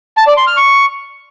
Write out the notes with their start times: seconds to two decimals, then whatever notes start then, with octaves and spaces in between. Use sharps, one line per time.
0.17 A5
0.27 D5
0.37 C6
0.47 F6
0.57 C#6